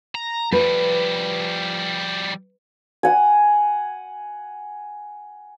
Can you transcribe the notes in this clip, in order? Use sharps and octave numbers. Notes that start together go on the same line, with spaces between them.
A#5
F3 G3 B4
F#5 G#5